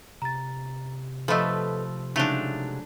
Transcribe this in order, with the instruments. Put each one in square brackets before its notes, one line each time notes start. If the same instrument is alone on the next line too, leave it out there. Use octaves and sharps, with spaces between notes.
[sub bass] C3 [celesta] A#5 A6
[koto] F3 A3 [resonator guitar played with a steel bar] A4 B4 D#5 [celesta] B5 E6
[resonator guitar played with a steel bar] C#3 F#3 G#3 [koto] A3 D4 [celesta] D#4 F7 G7